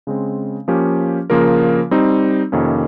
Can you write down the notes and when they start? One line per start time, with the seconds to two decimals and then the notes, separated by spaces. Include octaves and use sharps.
0.07 C#3 G#3 C4
0.68 F3 A#3 C#4 G4
1.30 C#3 F3 A#3 F4 A#4
1.91 G3 C4 D#4
2.52 F2 C3 D#3 A#3 C#4